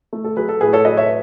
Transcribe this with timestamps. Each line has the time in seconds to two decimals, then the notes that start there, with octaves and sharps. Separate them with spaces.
0.13 A3
0.24 A4
0.37 F#3 G#4 B4
0.49 A4
0.61 A2 G#4 B4
0.73 A4 C#5
0.85 F#3 B4 D#5
0.97 C#5 E5